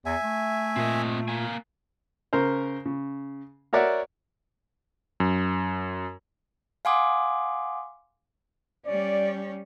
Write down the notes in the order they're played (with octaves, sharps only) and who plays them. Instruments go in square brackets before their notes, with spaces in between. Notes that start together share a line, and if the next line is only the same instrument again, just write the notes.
[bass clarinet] E2 [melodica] E5 G#5
[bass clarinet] A3
[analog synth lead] A#2 [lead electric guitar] C4 D#5
[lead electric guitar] A#3 G#5
[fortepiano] C#3 A#4 C5
C#3
F#4 A#4 C#5 D5 E5 F#5
[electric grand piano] F#2
[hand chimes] F5 F#5 G#5 C6 D6 D#6
[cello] G3 C#4 [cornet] D5